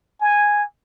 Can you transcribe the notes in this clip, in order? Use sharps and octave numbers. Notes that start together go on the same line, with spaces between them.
G#5